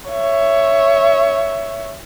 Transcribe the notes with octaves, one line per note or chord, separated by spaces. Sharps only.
C#5 E5